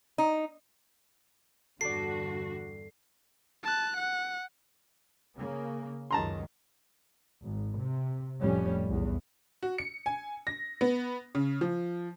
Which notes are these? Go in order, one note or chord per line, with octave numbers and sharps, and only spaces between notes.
D#4
E2 G2 D3 F#4 A4 D5 C7
A5 F#6
F#5
C#3 A#3
C#2 F#2 D#3 A5 A#5 C6
G#1
C3
F1 F2 A2 G3 C#4
B1 E2
F#4
C#7
G#5
A#6
B3
C#3
F3